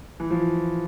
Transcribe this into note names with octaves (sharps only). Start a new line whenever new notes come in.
E3
F3